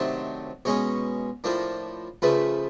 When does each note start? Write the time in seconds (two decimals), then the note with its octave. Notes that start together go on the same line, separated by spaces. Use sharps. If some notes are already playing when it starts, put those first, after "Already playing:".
Already playing: C3 D#3 F#3 A3 D4 C5
0.65 B2 G#3 C#4 C#5
1.44 A2 F3 A#3 D4
2.22 C#3 F3 A3 B4